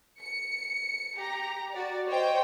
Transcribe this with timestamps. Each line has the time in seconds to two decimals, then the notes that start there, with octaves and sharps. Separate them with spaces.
0.19 C#7
1.17 G4 A#5
1.72 F#4 D5
2.08 C5 C#5 D#5 G5